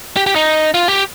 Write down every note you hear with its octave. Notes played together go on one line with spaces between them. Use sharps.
G4
G4
D#4
F4
G4